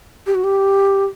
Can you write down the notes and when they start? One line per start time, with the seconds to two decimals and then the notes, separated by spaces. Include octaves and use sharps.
0.27 G4
0.35 F#4
0.44 G4